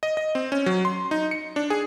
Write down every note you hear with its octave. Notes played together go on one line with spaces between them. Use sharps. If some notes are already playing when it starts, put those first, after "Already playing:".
D#5
D#5
C4
C#4
F#3
C6
D#4
C#7
D4
G#4